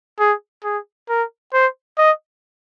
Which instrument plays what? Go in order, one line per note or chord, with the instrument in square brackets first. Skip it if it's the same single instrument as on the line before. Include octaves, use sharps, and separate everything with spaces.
[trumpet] G#4
G#4
A#4
C5
D#5